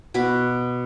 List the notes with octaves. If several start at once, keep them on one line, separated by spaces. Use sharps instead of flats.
B2 F#4 B5 D6